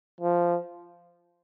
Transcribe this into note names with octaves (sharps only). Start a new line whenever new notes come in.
F3